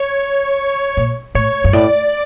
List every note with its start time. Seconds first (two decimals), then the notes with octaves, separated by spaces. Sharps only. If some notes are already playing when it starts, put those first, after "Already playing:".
Already playing: C#5
0.97 A#2
1.35 A2 C#5
1.64 G2
1.73 A2 D5